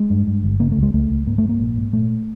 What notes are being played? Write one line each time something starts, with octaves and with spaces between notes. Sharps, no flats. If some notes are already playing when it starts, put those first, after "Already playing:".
Already playing: G#3
G2
G2
G1
C#3 A#3
A3
C#2
G#3
C#2 A3
C#2
G#2 A#3
A3
G#2
A#3
A#1
G#2
A#2 A3